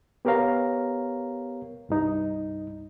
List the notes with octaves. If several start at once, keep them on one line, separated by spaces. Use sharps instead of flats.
B3 G4 A#4 C#5 F5 A#5
C2 G2 D#4